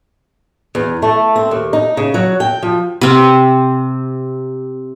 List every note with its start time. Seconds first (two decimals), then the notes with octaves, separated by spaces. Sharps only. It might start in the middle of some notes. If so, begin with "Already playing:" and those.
0.75 E2
1.02 A3
1.36 C4
1.51 D#2
1.73 D#4
1.97 C#3
2.14 F#3
2.40 G5
2.63 F3
3.01 C3 C4